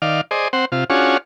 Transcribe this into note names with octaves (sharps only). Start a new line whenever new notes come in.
D#3 D5 F5
G#4 C5 D5 D#5
C4 C5 F#5
C3 F4
C#4 D4 F4 F#4 G#4 C#5